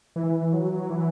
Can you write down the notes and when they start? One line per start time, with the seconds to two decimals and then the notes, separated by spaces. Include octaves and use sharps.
0.16 E3
0.53 F#3
0.90 E3